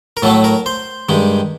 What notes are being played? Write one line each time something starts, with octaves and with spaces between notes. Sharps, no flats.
A#4
A2 F#3 A3 A4
A#4
C5
G2 D#3 G#3